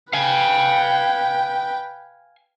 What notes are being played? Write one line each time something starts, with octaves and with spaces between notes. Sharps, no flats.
B4 F5 G5 G#5